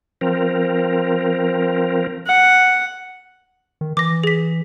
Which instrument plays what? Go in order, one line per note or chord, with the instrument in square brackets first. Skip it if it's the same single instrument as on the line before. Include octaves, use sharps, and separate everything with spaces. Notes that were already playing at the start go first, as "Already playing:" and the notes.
[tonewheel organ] F3 C4 A#4
[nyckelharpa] F#5
[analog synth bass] D#3
[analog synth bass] E3 [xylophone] D6 A#6
[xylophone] G#4 B6